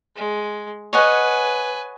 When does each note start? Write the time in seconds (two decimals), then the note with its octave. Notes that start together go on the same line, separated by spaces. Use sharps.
0.16 G#3
0.93 B4 C#5 D#5 F#5 G#5